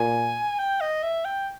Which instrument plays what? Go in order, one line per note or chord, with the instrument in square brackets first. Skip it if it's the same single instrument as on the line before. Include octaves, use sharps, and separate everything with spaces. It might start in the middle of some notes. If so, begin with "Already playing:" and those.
Already playing: [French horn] A#2 [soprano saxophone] G#5
[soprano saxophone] G5
D#5
E5
G5